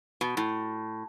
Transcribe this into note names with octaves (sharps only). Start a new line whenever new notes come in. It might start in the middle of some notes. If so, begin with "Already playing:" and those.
B2
A2